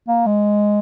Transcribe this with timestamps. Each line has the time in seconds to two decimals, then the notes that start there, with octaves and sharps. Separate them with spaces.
0.08 A#3
0.26 G#3